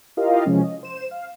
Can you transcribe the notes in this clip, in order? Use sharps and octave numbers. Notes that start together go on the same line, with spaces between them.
E4 F4 G4 A#4 D#5 F5
C3 E3 F3 G#3 C#4
D#5
C5 E7
F5